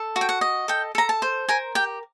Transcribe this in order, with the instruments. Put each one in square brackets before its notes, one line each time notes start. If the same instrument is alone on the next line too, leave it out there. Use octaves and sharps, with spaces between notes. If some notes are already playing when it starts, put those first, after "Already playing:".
Already playing: [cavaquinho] A4
F#4
G5
F#5
D#5
A4 G5
A4 A#5
A5
C5
A#4 G#5
G4 G5